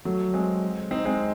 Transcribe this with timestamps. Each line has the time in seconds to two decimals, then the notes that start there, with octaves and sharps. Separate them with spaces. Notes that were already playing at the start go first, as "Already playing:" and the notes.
0.05 F#3 A3
0.34 G#3 C4
0.91 C4 D#4
1.05 G#3 C4